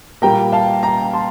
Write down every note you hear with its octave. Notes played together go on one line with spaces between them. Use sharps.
A#2 G3 A#3 G5 A#5
F5 A5
G5 A#5
A5 C6